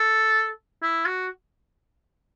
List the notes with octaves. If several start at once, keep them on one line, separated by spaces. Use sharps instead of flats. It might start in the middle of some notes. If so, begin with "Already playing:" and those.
Already playing: A4
E4
F#4